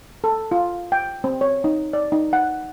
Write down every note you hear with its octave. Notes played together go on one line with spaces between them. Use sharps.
A4
F4
G5
C4
C#5
D#4
D5
D#4
F#5